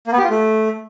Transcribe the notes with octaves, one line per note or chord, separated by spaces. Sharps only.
A#3
B3
G4
F4
A3